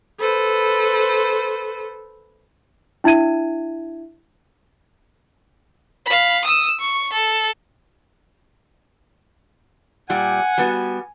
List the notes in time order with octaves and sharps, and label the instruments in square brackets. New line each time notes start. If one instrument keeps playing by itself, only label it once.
[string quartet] A4 B4 C5
[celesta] D4 E4 E5 G#6 D#7
[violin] F5 B5
D#6 E6
C#6
A4
[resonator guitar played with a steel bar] A#2 G3 [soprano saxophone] F#5 [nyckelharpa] G#5
[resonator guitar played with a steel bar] G3 B3 F#4